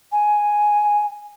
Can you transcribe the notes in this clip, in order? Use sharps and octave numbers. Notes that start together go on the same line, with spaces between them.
G#5